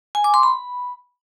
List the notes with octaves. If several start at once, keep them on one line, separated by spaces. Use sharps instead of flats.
G#5
D6
C6
B5